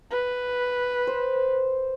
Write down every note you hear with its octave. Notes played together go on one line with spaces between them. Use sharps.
B4
C5